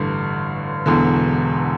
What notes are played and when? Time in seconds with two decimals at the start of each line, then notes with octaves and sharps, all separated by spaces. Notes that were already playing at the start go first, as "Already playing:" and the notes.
Already playing: A1 G2 D3
0.86 E1 E2 D3